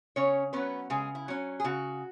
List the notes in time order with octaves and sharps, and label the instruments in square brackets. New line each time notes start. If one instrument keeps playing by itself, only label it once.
[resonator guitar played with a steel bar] C#3 C#4 C#5
F#3 B3 C#4 B4
C#3 G#3 G#4
E4
F#3 C#4
G#4
C#3 F#4